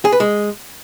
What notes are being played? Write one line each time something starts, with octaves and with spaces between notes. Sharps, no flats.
G#4
B4
G#3